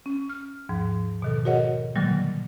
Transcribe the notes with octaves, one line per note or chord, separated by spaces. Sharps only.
C#4
F6
D#2 G#2 F3
B2 D#3 A4
F#4 G#4 A#4 C#5 D#5 F#5
A#2 D3 D#3 F#3 G3 A#3